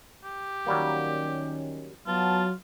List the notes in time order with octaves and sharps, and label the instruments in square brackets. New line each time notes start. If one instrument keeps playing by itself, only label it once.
[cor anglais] G4
[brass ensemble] D#3 C#4 [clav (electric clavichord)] F#3 G3 A#3
[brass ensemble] F#3 [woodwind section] B3 A5 [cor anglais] F4